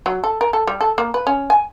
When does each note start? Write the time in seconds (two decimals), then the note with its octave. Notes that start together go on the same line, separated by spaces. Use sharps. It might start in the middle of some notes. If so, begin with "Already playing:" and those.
0.06 F#3
0.24 A4
0.41 A#4
0.53 A4
0.67 G3
0.81 A4
0.98 A#3
1.14 B4
1.27 C#4
1.50 G#5